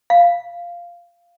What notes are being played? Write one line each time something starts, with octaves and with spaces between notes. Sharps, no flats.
F5